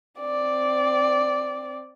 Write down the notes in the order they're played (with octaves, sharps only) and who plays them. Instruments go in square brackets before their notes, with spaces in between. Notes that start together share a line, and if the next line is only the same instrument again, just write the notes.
[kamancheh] C4 D5